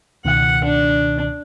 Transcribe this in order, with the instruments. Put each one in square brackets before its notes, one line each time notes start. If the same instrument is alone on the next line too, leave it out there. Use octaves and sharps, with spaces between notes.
[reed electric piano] C#2 B2 D#3 [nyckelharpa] F#5
[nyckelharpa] D4